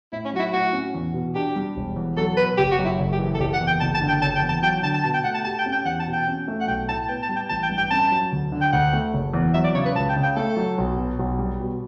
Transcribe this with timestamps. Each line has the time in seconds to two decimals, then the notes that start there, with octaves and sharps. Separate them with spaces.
0.12 A2 E4
0.25 C#4
0.33 F#3 F#4
0.39 E4
0.53 A2 F#4
0.73 C#4
0.94 E2
1.14 B2
1.35 D4 G4
1.56 G3
1.76 E1
1.96 E2
2.17 F#3 A4
2.37 B2 B4
2.57 F#1 G4
2.71 F#4
2.79 F#2
2.85 E4
2.99 F#1
3.13 G4
3.19 E3
3.35 A4
3.39 F#1 G4
3.53 F#5
3.61 E2
3.67 G5
3.80 F#1 A5
3.95 A5
4.01 D3
4.08 G5
4.22 F#1 A5
4.36 G5
4.42 E2
4.49 A5
4.62 F#3 G5
4.83 D3 A5
4.94 A5
5.04 B2 A5
5.14 G5
5.24 A3 F#5
5.34 A5
5.45 G4 A5
5.59 G5
5.66 C#4
5.72 G5
5.85 E2 F#5
6.00 A5
6.06 B2
6.13 G5
6.27 C#4
6.48 A3
6.61 F#5
6.67 B1 G5
6.89 A2 A5
7.08 B3 G5
7.23 A5
7.29 G3
7.36 G5
7.49 A1 A5
7.63 G5
7.70 G2
7.77 G5
7.91 C#4 A5
8.11 F#3
8.32 D2
8.52 D3
8.62 G5
8.73 D2 F#5
8.93 A3
9.14 F#1
9.34 E2
9.54 F#3 E5
9.64 D5
9.75 C#3 C#5
9.85 B4
9.95 C#2 A5
10.09 G5
10.16 C#3
10.23 G5
10.36 A3 A4
10.57 F#3
10.78 B1
10.97 B2
11.19 B1
11.39 G3
11.60 B2